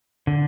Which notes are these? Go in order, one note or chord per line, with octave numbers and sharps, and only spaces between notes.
D3